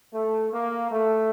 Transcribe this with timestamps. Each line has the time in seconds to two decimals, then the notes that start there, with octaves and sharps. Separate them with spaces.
0.12 A3
0.52 A#3
0.91 A3